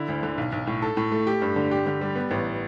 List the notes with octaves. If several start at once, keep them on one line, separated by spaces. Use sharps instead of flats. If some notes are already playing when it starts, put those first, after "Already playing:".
Already playing: D3 E4
D2
D3
B1
B1
A2
A4
A2
A3
G4
G2
D3
G4
D3
G3
B3
A1